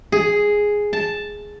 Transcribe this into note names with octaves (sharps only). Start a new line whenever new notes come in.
G#4
A5